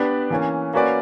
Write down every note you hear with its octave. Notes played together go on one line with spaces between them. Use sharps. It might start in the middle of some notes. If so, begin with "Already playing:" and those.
Already playing: B3 D4 G4 B4 D5
E3 A#3 C#4
A#3 C#4 F#4 B4 D5